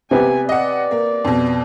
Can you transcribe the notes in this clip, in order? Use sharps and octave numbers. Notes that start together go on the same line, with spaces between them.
C3 B3 C4 G4 G#5
D5 D#5 F#5
A#3
F2 B2